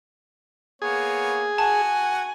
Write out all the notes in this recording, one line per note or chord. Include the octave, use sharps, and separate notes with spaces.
A#3 B3 G#4 C#5
F#4 F#5 G#5 A5